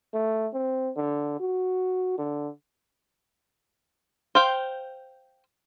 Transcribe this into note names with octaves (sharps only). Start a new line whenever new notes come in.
A3
C4
D3
F#4
D3
C5 F5 G5